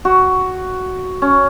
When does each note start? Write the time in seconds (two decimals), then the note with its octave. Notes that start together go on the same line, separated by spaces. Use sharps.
0.05 F#4
1.22 C#4